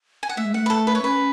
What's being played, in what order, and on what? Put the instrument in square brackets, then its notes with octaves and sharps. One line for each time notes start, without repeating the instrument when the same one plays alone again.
[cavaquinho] G#5
F#5
[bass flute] A3 [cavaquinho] E5
[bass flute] G#3
[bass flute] A3 [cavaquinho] F#5
[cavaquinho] B4
A4
B4
C#5
[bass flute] C#4 [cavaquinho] B4